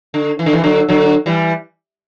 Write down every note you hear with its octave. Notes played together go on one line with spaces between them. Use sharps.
D3
E3
D3
C3 E3
D3 F#3
D3 F#3
E3 G3